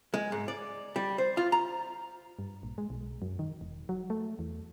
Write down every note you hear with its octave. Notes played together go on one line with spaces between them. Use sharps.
G#3
G#2
D5
G3
C5
F4
A#5
G2
A#1
G#3
B1
F#2
D#3
E1
F#3
A3
E2